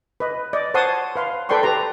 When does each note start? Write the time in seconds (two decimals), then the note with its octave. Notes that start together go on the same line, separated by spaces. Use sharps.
0.20 B4 D#5
0.53 D5 D#5
0.74 C5 C#5 F#5 A5 C6 D#6
1.16 B4 F5 C6
1.49 A4 B4 D5 G5 C6 C#6
1.63 G4 B4 A#5